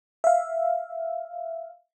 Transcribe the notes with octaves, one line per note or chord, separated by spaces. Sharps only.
E5 F5